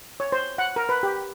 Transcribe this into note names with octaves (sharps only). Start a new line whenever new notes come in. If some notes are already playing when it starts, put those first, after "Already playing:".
C#5
C5
F#5
A#4
B4
G4